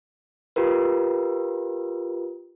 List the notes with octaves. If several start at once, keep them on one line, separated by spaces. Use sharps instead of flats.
F4 G4 A#4 B4